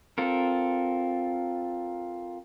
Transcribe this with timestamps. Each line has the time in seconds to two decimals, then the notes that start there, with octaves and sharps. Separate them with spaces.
0.18 C4 F4 A4 A#4